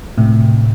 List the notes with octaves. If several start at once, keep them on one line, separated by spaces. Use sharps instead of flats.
A2 C3